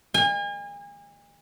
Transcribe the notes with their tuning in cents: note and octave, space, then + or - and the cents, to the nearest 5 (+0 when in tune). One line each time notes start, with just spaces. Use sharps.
G#5 -40